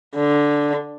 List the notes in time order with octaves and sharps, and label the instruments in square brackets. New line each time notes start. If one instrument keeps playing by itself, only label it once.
[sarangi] D3